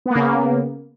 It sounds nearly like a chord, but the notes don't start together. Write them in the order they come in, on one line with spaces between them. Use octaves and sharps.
B3 A#3 C#3